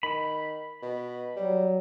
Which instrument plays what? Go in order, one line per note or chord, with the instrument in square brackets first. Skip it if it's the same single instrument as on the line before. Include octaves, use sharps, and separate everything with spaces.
[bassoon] D#3 [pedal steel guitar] B5
[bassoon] B2
[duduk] F#3 [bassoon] G3